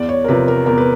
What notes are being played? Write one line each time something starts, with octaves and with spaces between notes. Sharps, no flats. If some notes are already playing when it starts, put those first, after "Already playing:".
Already playing: E2 D5
C#5
A#4
C3 F3 B4
A#4
E2 A#4
B4